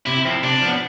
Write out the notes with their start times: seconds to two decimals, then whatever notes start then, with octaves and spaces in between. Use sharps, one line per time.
0.06 C3 E4
0.25 F3 C4 E4
0.43 C3 D4
0.62 F3 B3